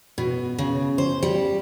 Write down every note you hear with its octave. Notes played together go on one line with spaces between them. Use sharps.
B2
C#3
C5
G3